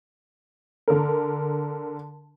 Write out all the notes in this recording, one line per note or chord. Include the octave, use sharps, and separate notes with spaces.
D3 A#4